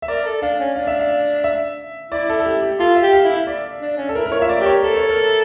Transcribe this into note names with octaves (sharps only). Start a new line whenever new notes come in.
E5
A#4 D5
A4
D4 F5
C#4
D4 F5
E5
F5
E5
E4 D5
A4
A4
G4
G4
F4 A4
E5
G4
F5
E4
E5
D5
D4
C#4
A4
E4 A#4
A#4
C#5
F4 E5
D5
G4 A#4
C#5
A4 A#4
C#5
A#4